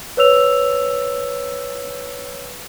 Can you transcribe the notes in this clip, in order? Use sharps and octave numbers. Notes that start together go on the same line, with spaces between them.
B4 C#5 E6 F7